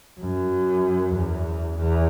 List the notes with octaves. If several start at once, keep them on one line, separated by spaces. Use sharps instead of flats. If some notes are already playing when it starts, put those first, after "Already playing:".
F#2
E2
E2